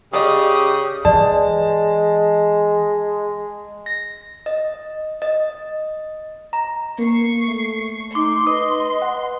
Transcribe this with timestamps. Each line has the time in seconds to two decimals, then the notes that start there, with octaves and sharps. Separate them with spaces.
0.13 C#3 C#4 G4 D5 D#5 D#6
1.05 E3 G#3 D5 A5
3.86 A#6
4.46 D#5
5.22 D#5
6.53 A#5
6.98 A#3 C#6 C7
7.47 A3
8.15 D#4 C6 D6
8.47 B4 D#5 D#6
9.02 F#5